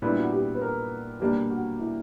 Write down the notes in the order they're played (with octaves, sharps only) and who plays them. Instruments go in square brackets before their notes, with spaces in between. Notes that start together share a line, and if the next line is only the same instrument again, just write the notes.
[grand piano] A#2 G3 B3 E4 [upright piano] D4
[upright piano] F#4
G4
B4
A#4
[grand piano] B2 G3 A#3 D4 [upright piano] G4
[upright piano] F#4
E4